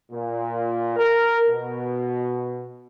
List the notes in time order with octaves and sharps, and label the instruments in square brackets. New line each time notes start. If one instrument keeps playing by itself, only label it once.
[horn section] A#2
A#4
B2